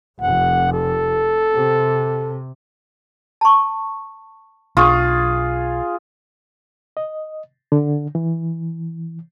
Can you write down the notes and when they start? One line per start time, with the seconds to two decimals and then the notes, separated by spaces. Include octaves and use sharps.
0.21 F1 F#5
0.72 A4
1.52 C3
3.41 A5 C#6
4.77 B1 D4 F4 G#4 C#6
6.97 D#5
7.72 D3
8.15 E3